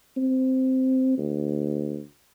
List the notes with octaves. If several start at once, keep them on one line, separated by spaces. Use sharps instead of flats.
C4
D2